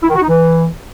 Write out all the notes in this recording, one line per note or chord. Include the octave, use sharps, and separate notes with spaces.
E4
D#3
F#4
D#4
E3